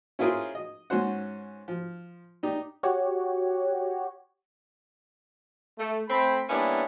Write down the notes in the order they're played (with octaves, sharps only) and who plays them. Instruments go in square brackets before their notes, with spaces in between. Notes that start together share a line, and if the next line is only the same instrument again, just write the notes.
[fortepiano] C#4 E4 F4 G#4 A#4 C5
D#5
G#2 C#4 F#4 C5 F#5
F3
D4 D#4 G4
[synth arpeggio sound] F#4 G4 C#5
[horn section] A3
A3 C4 B5
G3 A#3 B3 C#4 D4 E4